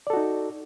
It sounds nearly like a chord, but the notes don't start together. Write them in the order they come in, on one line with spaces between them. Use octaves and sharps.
D5 A4 F#4 D#4